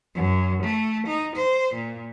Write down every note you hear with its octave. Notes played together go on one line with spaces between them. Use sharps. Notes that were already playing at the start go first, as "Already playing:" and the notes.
F#2
A3
D#4
C5
A#2